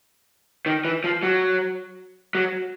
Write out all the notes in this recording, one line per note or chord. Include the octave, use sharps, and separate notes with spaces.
D#3
E3
F3
F#3
F#3